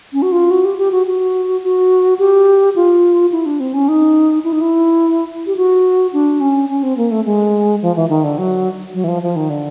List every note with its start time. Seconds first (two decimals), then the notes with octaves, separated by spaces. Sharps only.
0.13 C#4
0.22 F#4
0.32 F4
0.51 F#4
0.65 G4
0.78 G4
0.92 F#4
1.07 F#4
1.63 F#4
2.19 G4
2.76 F4
3.32 E4
3.46 D4
3.60 C4
3.74 C#4
3.88 D#4
4.44 E4
4.53 D#4
4.61 E4
5.47 G4
5.57 F#4
6.13 D4
6.40 C#4
6.69 C#4
6.83 C4
6.97 A#3
7.11 A3
7.25 G#3
7.82 F3
7.96 E3
8.09 D#3
8.24 D3
8.38 F#3
8.94 F#3
9.04 E3
9.08 F3
9.22 F3
9.36 D#3
9.50 D3